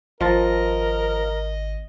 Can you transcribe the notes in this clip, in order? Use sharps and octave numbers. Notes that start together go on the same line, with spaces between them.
G#1 F3 F4 A#4 D#5 A5